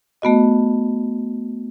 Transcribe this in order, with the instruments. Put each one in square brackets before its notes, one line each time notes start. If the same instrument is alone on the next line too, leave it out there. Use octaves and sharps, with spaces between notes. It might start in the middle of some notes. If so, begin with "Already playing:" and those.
[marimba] A3 B3 F#4 D#5